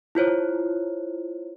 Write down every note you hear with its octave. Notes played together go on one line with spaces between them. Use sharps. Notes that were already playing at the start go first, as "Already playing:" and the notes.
E4 F4 C5 C#5